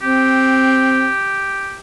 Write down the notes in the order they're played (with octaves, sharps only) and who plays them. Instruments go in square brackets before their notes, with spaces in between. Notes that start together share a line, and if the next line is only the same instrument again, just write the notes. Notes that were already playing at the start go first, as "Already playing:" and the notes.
[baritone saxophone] C4 [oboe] G4